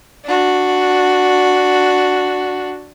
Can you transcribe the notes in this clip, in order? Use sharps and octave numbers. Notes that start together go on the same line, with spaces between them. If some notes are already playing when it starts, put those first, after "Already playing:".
D4 F#4